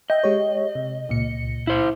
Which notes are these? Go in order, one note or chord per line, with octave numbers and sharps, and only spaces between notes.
D#5 E5 G5 G6
G#3 G4 C#5
C3
C#2 A#2 C#7
E4 C5